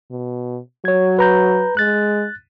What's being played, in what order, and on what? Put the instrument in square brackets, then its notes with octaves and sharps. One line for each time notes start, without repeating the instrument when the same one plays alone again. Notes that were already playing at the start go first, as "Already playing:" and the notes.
[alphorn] B2
[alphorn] F#3 [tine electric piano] C#5 G#6
[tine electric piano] B4 A#5 G6
[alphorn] G#3 [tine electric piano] F#6 A6